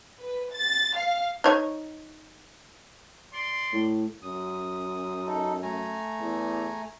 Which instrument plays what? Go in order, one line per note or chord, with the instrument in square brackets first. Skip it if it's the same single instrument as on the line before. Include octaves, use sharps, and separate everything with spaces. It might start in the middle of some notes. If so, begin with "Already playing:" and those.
[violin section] B4
A6
F5
[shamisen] D#4 C#5
[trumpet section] D5 C6
[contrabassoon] A2
[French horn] F#2 [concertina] D#6
[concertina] D#4 A4
A3 G#5 A#5
[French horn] E2